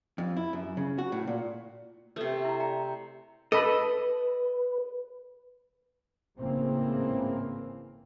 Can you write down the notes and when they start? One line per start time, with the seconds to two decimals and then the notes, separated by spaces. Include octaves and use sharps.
0.18 F2
0.37 E4
0.53 F#2
0.77 C#3
0.98 F#4
1.12 A2
1.27 A#2
2.16 C3 A3 A4 B4
2.45 E4 A#5
2.60 D5 G5 A#5
3.52 A4 B4 D#5 B5
6.38 G#1 A2 C#3 E3 A#3 C4